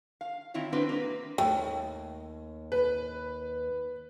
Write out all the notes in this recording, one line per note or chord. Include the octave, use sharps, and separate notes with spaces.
F5
D#3 C4 E4 F4 C#5
A2 C4 D4 F#4 B4
A#3 B4
D#2 A3 G5
B4